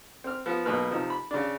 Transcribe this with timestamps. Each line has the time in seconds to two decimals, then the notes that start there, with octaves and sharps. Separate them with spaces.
0.24 C4 F6
0.46 F3 B3
0.65 B1 B2 A#3 B4 F6
0.90 C3 F3 D#4
1.10 B5
1.31 C#3 D4